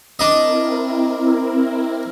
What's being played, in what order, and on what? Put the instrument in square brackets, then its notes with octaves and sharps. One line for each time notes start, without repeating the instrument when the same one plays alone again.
[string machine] C4 E4 A#4 [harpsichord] D4 D#5